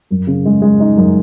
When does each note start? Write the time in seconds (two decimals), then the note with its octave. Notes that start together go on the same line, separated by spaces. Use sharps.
0.11 F#2
0.27 C#3
0.45 G#3
0.62 G#3
0.80 D#4
0.97 F#2